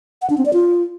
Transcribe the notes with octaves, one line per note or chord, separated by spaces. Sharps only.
F#5
D4
C4
D5
F4